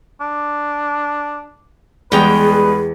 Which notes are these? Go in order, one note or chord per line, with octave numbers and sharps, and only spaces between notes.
D4
E2 G3 G#3 B3 G#4 B4 G5 A#5